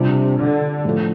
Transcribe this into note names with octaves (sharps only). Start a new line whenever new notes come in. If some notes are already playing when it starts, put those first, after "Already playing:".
Already playing: C3 G3 D4 F4
D3
A2 F3 A3